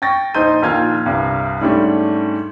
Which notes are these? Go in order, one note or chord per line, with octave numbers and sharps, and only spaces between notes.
G5 C#6 A6 A#6
A#1 D#4 C5 C6 G6 D#7
A#1 D#3 A#3 F4 F6 G#6
C2 G2 C3
G#2 G3 A3 C#4 D4